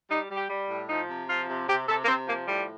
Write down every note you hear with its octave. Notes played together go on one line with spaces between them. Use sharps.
G3 D#4
G3
G4
G3
A2
F3 D#4
C3
F3 F4
C3
C3 G4
C3 A4
A#3
C3 C4
F3 A#3
A2 G3